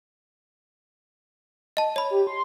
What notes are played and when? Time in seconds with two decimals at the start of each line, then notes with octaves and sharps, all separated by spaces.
1.77 D#5 A5
1.96 C#5 B5
2.10 G4
2.27 C6